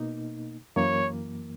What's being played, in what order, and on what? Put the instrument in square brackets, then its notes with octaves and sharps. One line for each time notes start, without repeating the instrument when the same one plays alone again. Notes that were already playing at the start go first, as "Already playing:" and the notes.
Already playing: [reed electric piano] B2 A#3 D#4
[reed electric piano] F#2 E3 A#3 [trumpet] C#5